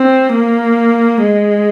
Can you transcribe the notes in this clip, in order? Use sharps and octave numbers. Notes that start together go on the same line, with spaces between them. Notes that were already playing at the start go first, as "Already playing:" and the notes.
Already playing: C4
A#3
G#3